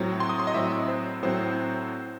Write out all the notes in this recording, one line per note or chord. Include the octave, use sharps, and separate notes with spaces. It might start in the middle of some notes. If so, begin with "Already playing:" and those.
Already playing: A2 F#3 C4
C6
D#6
C6
D#5
A2 F#3 C4 E5
C5
A2 F#3 C4 C5